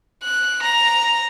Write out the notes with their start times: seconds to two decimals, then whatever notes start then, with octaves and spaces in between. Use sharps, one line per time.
0.23 F#6
0.62 A#5